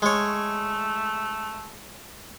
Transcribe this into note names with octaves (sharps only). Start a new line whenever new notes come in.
G#3 A3 C#5